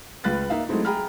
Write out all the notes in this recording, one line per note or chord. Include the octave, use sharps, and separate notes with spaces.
C#2 F4 B4 F#6 A6
A#3 D#4 E5 F5
F#3 G#3 A3 C4 D#4 E4
G#4 G5 A#5 B5 F6